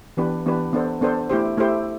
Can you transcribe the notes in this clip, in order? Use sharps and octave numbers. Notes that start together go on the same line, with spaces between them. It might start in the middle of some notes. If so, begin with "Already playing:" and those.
E3 B3 D4 G4 B4
E3 B3 D4 G4 B4
B3 D4 A4 C5
B3 D4 A4 C5
A3 E4 G4 C5
A3 E4 G4 C5